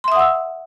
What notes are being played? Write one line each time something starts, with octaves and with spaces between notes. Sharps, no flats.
E5 F#5 C6 D#6 E6